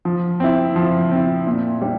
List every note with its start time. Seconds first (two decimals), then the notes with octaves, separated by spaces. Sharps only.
0.05 F3
0.40 C4 E4
0.76 F3
1.11 C4 E4
1.47 A#2
1.82 G3 D4